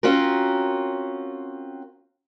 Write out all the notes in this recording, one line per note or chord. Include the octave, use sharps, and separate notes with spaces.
C4 C#4 F4 F#4 A#4